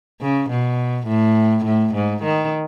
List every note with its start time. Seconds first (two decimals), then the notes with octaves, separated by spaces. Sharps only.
0.21 C#3
0.50 B2
1.07 A2
1.65 A2
1.95 G#2
2.23 D#3